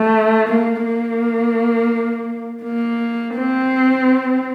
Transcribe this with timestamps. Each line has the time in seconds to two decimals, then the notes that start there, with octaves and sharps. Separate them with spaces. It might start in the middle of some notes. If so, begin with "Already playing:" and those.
Already playing: A3
0.49 A#3
0.85 A#3
2.63 A#3
3.35 C4